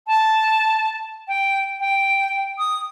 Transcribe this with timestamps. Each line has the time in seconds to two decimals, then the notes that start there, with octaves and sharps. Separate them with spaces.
0.07 A5
1.28 G5
1.80 G5
2.58 D#6